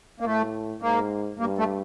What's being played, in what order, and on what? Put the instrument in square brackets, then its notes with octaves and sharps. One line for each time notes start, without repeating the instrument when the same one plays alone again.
[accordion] A#3
[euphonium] A2 [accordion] A3
[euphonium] G#2 [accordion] A#3
[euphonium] G2 [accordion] A#3
[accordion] A3